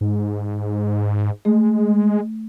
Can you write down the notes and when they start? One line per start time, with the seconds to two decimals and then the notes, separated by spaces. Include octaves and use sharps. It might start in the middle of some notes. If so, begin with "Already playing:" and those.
0.01 G#2
1.45 G#3 A3